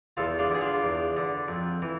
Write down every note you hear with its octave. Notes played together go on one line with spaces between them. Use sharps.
E2 F4 A4
D4 F4
D3 G#4
D4 F4
E2
D3
F2
E3